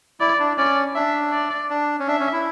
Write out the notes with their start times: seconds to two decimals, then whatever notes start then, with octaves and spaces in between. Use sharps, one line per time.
0.20 E4 D5
0.40 D4
0.58 C#4 D5
0.95 D4 E5
1.33 D5
1.70 D4
2.00 C#4
2.08 D4 E5
2.20 C#4
2.32 E4